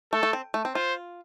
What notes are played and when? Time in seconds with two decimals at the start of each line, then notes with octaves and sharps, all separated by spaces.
0.13 A3 A4
0.23 A3
0.33 C4
0.54 A3
0.65 C4
0.75 F4 C5